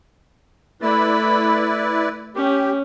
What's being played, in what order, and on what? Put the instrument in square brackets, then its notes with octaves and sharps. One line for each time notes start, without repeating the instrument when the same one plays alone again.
[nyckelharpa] A3 B5 [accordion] E4 B4 D5
[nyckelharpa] C#4 [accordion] G4